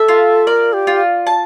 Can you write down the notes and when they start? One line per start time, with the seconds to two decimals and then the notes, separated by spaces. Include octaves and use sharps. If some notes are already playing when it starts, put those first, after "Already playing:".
Already playing: A4 E5
0.08 F4
0.47 A#4 D5
0.73 G4
0.87 F4
1.27 A5